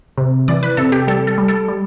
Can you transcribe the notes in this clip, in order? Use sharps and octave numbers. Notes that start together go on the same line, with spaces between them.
C3
E3 D5
B4
C3 A4
G4
G3 A4
A4
G3
A4
G3